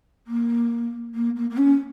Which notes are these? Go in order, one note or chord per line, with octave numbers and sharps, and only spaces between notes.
A#3
A#3
A#3
A#3
C#4